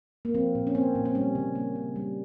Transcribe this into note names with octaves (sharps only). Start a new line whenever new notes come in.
A#3
F3 C4
A#2
C#4
A#3 C4
A#2
C4
G3 C#4
C#3
A#3
C#3
G3